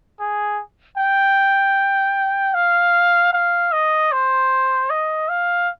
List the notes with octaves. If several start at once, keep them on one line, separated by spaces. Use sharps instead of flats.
G#4
G5
F5
F5
D#5
C5
D#5
F5